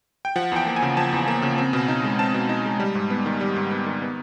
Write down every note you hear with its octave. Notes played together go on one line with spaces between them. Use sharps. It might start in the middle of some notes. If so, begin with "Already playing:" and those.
G5
F3 F#5
E2 G5
A#3
G#5
C#3
F3 A5
E2
A#3
C#3
C4
B2
D#4
G#3
C4 A5
B2
D#4
G#3
G3
G#2
B3
D#3
G3
G#2
B3
D#3
B3